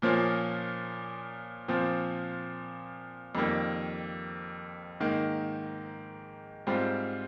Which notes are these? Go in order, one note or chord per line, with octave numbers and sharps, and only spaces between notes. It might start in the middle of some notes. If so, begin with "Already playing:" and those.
A#2 F3 A#3 C#4 F4
A#2 F3 C4 F4
F2 D#3 G3 A#3
G#2 D#3 A#3 D#4
G#2 G3 C4 F4